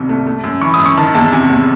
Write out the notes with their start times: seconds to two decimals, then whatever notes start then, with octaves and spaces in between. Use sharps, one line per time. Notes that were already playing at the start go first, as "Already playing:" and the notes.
Already playing: C2 C3 D#3
0.09 A3
0.27 A3
0.44 F#2
0.62 E3 C#6
0.74 D#6
0.79 F#2
0.86 C#6
0.97 D#3 A5
1.14 E2 A5
1.33 C3 G#5
1.50 E2